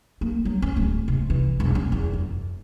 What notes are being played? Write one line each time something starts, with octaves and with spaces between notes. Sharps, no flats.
A#3
F#3
C#4
D1
C3
E3
E1
C#4
E2
F#2